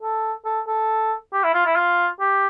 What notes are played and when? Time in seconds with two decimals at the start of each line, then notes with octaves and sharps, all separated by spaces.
0.02 A4
0.45 A4
0.67 A4
1.33 G4
1.44 E4
1.54 F4
1.66 E4
1.76 F4
2.20 G4